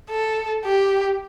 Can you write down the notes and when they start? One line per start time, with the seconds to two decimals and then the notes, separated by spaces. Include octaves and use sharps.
0.10 A4
0.65 G4